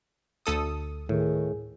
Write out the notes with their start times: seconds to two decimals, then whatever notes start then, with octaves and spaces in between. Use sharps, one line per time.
0.46 D2 A4 D#6
1.09 A2 D#3 G#4